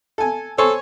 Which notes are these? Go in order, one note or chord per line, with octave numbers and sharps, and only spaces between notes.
A4 G#5
A4 C5 C#5 G#5